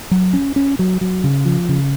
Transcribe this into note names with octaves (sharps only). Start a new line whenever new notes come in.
F#3
C#4
C#4
F#3
F#3
C#3
F3
C#3